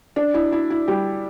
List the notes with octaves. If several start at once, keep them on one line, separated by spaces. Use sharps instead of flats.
D4
E4
E4
E4
G3 G4